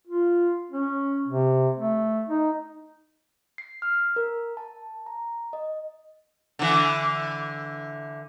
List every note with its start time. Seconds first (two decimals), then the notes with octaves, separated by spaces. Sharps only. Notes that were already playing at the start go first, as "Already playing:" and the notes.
0.07 F4
0.71 C#4
1.28 C3
1.78 A3
2.29 D#4
3.58 C7
3.82 F6
4.16 A#4
4.57 A5
5.06 A#5
5.53 D#5
6.59 D3 E3